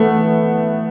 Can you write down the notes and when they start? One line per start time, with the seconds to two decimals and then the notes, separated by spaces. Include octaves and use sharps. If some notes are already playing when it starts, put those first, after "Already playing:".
Already playing: E3 A3 B3
0.15 E3